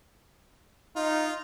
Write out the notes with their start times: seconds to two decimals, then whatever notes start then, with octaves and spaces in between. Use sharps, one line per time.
0.96 D#4 F4